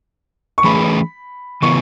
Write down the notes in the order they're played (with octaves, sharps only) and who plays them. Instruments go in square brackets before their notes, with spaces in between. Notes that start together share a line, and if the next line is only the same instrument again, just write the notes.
[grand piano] C#6
[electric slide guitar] E3 A3 C#4 G#4 B4 [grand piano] B5
[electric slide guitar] C#3 E3 B3 [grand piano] C#6